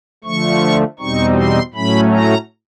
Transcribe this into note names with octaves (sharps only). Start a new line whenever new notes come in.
D3 F3 A3 C#6
E2 B2 G3 C4 D#4 C#6
C6
A2 F#3 A3 C#4 B5
A#5